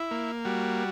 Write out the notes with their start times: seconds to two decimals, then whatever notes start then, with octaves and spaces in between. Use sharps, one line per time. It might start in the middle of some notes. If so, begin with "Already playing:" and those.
Already playing: E4
0.11 A#3
0.45 G3 F#4